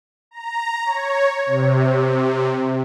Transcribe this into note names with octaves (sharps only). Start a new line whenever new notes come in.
A#5
C#5
C3